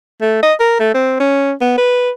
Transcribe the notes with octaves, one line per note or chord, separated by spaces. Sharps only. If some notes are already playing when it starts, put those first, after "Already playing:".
A3
D#5
A#4
A3
C4
C#4
B3
B4